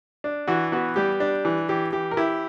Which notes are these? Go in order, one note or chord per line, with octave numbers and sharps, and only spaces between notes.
D4
E3 F#4
B3 F#4
G3 G4
D4
E3
E3 G4
E3 G4
A#4
E4 G4